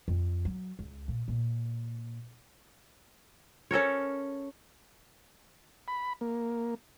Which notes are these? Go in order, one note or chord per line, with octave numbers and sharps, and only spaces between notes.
F2
F#3
C#2
A#2
A#2
C#4 A4 A#4 C#5
B5
A#3